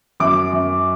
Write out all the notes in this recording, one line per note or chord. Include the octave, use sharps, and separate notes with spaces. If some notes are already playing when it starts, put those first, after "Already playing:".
F#2 D6
F#2